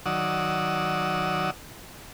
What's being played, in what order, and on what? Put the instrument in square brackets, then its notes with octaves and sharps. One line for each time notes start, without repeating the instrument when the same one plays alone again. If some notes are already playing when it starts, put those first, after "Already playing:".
[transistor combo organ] D#3 F#3 D5 F#5 D#6 E6